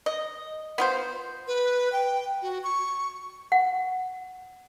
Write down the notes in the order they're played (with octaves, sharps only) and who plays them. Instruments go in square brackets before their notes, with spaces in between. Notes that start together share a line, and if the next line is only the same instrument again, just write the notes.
[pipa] D#5
B3 F4 C5
[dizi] B4
G5
F#4
C#6
[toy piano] F#5